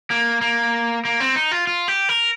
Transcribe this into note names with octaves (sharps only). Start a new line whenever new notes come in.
A#3
A#3
A#3
C4
D#4
F4
F4
G4
A#4